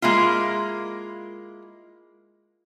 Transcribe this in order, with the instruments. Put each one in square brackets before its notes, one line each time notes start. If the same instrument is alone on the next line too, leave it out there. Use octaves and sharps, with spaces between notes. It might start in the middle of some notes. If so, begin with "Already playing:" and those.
[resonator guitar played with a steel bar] G#3 A#3 E4 F4